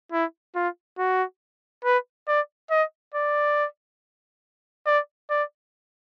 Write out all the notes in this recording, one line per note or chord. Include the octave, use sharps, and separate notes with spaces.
E4
F4
F#4
B4
D5
D#5
D5
D5
D5